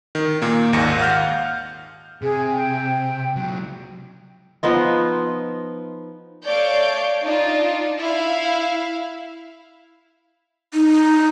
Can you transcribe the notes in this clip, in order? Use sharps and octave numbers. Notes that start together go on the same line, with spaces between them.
D#3
A#2 A#3
G#1 D#2 G#2 A#6 C#7
F5 F#5 F6 G6
C3 G#4
G5
C#2 F#3
F3 B3 D#4 F4
A3 C#5 D5 F5 G6 D7
D4 D#4 F4
E4 E5 F5
D#4